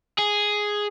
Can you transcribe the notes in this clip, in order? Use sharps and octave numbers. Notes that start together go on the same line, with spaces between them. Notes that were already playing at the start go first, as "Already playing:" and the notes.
G#4